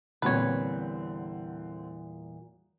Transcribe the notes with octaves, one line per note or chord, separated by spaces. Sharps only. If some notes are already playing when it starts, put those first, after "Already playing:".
E2 A#2 D3 G3 C4 B4 C#5